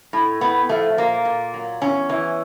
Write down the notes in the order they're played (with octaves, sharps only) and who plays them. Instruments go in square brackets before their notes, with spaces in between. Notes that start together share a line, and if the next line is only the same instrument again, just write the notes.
[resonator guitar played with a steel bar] A2
A2 B3
F3 A3
A#2 A#3
A#2
F#3
E2 C#4
E3